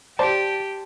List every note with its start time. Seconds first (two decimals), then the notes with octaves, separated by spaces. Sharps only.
0.19 G4 C5 D5 A5